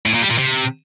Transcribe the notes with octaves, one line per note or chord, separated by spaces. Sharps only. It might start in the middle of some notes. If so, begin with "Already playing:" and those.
A2
A#2
G3
A#2
C3